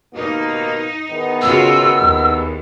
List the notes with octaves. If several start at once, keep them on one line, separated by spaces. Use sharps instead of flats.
D#2 B2 A#3 D#4
E2 D#3 B3
C#3 F4 F#4 E6
D#2